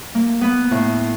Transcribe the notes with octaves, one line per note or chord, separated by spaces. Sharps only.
A#3
B3
A2